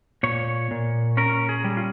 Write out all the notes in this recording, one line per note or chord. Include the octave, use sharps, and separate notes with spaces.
A#2 C#5
A#2
C#4 A#4
G#4
G3
F4